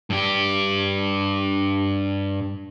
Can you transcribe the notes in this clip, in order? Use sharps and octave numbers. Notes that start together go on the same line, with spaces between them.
G2 G4